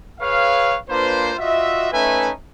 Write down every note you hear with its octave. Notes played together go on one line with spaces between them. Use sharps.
G#4 B4 C#5 F5
A#3 D4 F4 B4 C5
F4 F#4 D#5 E5
A3 C#4 D#4 B4 E5 G#5